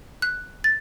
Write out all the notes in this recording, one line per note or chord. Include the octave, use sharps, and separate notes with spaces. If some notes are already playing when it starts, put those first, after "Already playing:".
F#6
A6